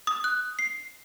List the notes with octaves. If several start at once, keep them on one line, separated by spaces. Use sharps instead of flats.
D#6
F#6
C7